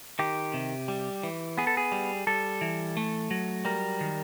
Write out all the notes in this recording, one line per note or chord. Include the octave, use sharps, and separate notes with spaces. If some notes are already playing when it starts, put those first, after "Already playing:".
D#3 G4
C3
G3
E3
B3 G#4
A4
G#4
G3
G3 A4
E3
A3
F#3
G3 A#4
D#3